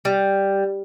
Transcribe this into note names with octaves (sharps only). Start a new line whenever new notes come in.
G3